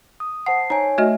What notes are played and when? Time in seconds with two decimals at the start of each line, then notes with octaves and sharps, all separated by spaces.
0.20 D#6
0.46 C5 F#5 A5 C7
0.70 D#4 C#5 G#5 A#5
0.98 A3 F#4 D#5 E5